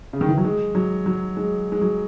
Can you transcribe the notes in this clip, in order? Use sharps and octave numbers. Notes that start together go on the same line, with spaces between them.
C#3
D#3
E3
F#3
G#3
F#3
F#3
G#3
G#3
F#3